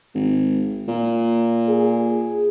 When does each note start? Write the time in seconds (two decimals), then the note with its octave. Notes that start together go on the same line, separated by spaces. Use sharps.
0.15 G#1
0.88 A#2
1.69 G#4